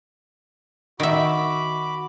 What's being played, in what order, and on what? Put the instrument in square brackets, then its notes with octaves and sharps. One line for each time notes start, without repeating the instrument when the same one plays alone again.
[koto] D#3 E5 [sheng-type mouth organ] F#4 B5 D6